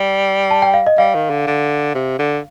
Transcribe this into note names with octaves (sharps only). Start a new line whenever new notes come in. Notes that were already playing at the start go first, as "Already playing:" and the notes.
Already playing: G3
A5
G5
F5
D#5
G3 F5
D#3
D3
D3
C3
D3